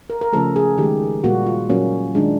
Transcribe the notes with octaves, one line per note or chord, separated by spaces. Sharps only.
A#4
A#4
C#3 F3 A3 A4
G#4
D#3 G#3 G4
A#2 G3 A#3 F#4
F4
A#2 F#3 A#3 C#4
D#3 G#3 D4